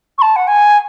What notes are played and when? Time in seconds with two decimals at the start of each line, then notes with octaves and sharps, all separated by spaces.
0.18 C#6
0.22 A5
0.36 F#5
0.47 G#5